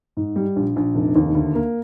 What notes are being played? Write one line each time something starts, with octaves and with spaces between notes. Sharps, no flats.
G#2
G3
A#1
A#1
F1
D#2
D2
A#3